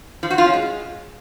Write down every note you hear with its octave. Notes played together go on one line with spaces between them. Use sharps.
F3
F#4
F4
C#4
G#3